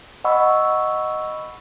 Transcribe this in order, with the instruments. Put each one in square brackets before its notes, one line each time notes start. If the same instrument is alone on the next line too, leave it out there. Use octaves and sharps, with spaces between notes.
[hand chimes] D#5 F#5 B5 C#6 E6